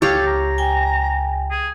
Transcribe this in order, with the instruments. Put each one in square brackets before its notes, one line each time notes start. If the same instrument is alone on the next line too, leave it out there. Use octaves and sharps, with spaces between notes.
[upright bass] C#2 [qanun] G4 C#5 F5 [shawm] A4
[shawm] A#5
[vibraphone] G5 G#5
[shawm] G#4